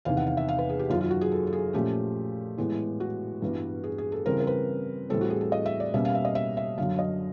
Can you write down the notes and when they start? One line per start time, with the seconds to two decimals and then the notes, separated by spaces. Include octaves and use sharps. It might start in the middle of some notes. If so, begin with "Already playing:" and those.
0.05 E2 C3 D#3 F5
0.17 F#5
0.27 F5
0.37 E5
0.49 F5
0.59 B4
0.69 G#4
0.79 G4
0.90 F#2 D#3 F#3 F4
1.01 F4
1.11 F#4
1.21 G#4
1.32 A4
1.47 A4
1.53 G#4
1.73 A#2 F3 A3 C#4 G4
2.58 A2 E3 G#3 B3
3.00 F#4
3.42 G2 E3 G3 B3
3.84 G#4
3.98 G#4
4.12 A4
4.26 C#3 E3 G3 C4 A#4
4.40 A#4
4.47 B4
5.10 A2 E3 G3 C4 A4
5.21 F#4
5.30 G#4
5.41 A4
5.52 D#5
5.66 E5
5.80 D5
5.94 B2 G3 A#3 C#4 E5
6.05 F5
6.15 E5
6.25 D#5
6.35 E5
6.57 E5
6.78 F#2 D3 F#3 F5
6.99 D#5